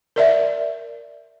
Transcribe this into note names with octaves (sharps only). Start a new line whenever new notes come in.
A#4 D5 E5